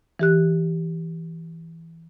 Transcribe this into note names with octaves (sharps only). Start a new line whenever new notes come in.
E3 G4 F#6